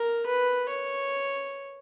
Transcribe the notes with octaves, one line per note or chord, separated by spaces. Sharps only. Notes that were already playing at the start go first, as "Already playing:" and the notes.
Already playing: A#4
B4
C#5